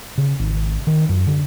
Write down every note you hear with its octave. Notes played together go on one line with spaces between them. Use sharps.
C#3
G#1
D#3
F#2
D3